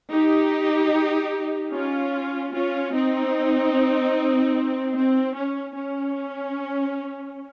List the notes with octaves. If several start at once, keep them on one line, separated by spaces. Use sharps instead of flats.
D#4 G4
C#4 F4
C#4 F4
C4 D#4
C4
C#4
C#4